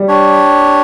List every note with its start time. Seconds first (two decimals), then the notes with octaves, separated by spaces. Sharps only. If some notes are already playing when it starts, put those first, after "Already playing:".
Already playing: G3
0.08 D4 G4 C#5